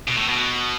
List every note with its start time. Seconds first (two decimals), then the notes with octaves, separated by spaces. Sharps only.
0.07 B2
0.17 A2
0.28 B2